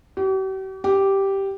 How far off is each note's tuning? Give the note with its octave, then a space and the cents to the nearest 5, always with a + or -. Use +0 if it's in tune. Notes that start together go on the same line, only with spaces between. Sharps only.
G4 -45
G4 -5